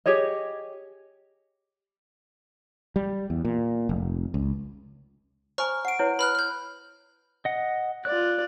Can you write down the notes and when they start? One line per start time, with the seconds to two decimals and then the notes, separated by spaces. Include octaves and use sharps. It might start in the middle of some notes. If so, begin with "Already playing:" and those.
0.06 G4 G#4 C#5 D#5
2.96 G3
3.30 E2
3.45 A#2
3.89 F1
4.34 C#2
5.58 C5 G#5 A#5 C#6 F6
5.85 F#5 C7 D7
5.99 E4 B4 C#5
6.19 B4 B5 F6 F#6
6.35 F6 G6
7.45 D#5 F#5
8.05 F4 D5 F#6